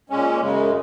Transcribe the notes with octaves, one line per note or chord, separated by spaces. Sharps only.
A#2 G#3 C#4
F#2 C#3 G#3